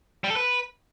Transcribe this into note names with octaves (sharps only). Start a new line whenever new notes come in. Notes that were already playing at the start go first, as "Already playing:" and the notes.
G3
A4
B4